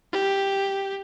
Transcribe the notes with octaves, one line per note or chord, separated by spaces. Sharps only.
G4